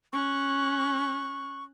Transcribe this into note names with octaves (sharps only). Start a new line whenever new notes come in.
C#4 C#6 F#6